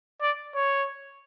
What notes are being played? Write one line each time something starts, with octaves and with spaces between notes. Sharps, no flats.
D5
C#5